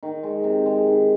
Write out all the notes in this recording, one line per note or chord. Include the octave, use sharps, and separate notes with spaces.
D#3
G#3
C3
G#3
D#3